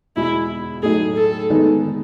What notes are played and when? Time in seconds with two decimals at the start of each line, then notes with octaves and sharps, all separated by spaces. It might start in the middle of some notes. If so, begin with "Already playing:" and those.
0.16 E2 B2 G#3 E4
0.83 A2 F#3 A3 D#4 G#4
1.16 A4
1.50 D#3 G#3 B3 D#4 A4